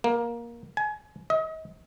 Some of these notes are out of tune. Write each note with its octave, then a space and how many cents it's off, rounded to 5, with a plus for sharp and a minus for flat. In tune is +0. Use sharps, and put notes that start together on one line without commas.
A#3 +15
G#5 +30
D#5 +35